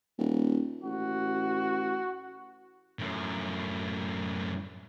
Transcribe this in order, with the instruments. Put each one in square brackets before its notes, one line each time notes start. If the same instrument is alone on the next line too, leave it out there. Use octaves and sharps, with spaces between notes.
[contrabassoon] D#1
[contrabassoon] A1 [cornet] F#4
[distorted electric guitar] F#2 A2